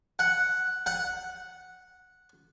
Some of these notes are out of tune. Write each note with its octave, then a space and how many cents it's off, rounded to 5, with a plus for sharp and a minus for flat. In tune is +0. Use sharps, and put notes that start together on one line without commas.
F#5 +0
F#5 -5